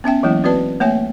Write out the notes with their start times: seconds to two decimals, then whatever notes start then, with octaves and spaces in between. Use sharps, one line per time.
0.04 B3 C#4 E5 G5
0.23 E3 F#3 G#3 A#3 E4
0.44 C4 F#4 B4 D5 A5
0.80 A3 A#3 C#5 E5 G#5